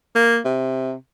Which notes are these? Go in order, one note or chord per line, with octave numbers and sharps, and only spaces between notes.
A#3
C3